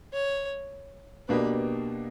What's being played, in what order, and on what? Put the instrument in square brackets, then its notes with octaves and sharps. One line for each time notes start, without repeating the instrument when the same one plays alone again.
[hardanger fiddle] C#5
[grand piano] B2 A#3 D4 G4 [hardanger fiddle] B4